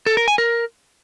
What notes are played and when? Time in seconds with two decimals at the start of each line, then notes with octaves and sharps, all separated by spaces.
0.06 A4
0.17 A#4
0.28 G#5
0.38 A#4